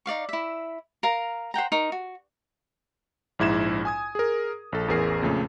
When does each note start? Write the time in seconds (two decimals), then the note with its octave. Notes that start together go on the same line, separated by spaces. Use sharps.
0.06 D#4 D5 F5 C#6
0.29 E4 E5
1.03 A#4 F5 A#5
1.54 C5 F#5 G5 A#5
1.72 D#4 A#4 C#6
1.92 F#4
3.39 A#1 G#2 E4 G#6 E7
3.85 G#5 D#6 G#6
4.15 G#4 A#4
4.72 A#1 A4
4.88 A1 E2 G#4 A#4 C7
5.22 F2 A#2 C#3 A3